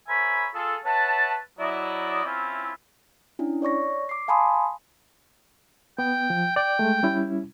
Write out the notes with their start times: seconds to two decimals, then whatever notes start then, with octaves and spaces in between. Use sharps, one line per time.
0.08 A#4 C5 C#5 E5 G#5 B5
0.54 F4 G#4 A4
0.85 B4 C#5 E5 F#5 A5
1.59 F#3 E4 D5 D#5
2.24 C4 C#4 E4 F4
3.39 C#4 D4 E4
3.62 C#5 D5 C#6 A#6
4.09 D6 C7
4.28 F5 G#5 A5 B5 C6 D#6
5.99 B3 G5
6.30 F3
6.56 D5 G5
6.79 G#3 A3
7.03 G3 C#4 E4